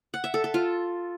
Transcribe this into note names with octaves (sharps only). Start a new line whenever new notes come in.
F#5
E5
A4
A4
F4